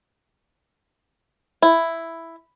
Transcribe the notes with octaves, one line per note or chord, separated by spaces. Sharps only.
E4